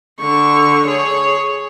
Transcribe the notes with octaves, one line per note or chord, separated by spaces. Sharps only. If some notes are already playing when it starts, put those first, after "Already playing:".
D3 C#6
G#4 C#5